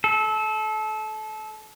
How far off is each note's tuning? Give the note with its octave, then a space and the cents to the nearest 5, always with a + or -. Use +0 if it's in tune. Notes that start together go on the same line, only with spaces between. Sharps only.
A4 -25